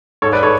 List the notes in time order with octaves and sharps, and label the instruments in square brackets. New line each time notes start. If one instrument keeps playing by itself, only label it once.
[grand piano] G#2 A4 C#5
B4 D5
A4 C#5